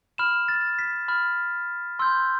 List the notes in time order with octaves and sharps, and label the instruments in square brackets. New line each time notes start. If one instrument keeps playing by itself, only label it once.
[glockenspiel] B5 F6 E7
A6
B6
B5 F6
C6 E6 G6